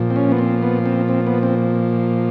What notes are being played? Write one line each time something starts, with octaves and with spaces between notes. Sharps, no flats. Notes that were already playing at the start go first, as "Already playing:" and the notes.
Already playing: A#2 F3
C4
C#4
B3
C4
B3
C4
C4
B3
C4